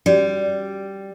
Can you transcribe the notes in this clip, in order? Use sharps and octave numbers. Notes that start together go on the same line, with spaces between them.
G3 C#4 F#4 D5